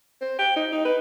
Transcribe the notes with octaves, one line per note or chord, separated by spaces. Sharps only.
C5
G5
D#4
D#4
B4